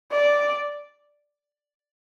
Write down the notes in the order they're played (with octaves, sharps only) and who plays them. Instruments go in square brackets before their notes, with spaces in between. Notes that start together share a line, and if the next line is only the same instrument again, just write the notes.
[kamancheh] D5